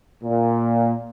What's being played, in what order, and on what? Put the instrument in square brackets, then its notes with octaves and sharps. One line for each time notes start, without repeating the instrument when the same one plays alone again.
[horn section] A#2